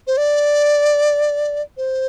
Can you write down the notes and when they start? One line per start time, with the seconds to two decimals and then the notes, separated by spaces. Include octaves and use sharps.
0.07 C5
0.17 D5
1.77 C5